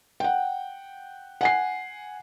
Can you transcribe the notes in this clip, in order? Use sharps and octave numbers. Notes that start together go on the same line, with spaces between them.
F#5 G5
F#5 G#5 C7